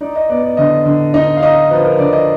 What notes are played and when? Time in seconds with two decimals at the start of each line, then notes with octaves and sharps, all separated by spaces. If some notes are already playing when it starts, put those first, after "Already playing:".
0.01 D#4 D5
0.16 D#5
0.29 B3 D5
0.43 D5
0.57 D3 D#5
0.85 D3
1.14 D#4 D#5
1.37 F5
1.42 D#4 D#5
1.70 F3 B4
1.85 A#4
1.98 D3 D5
2.13 D#5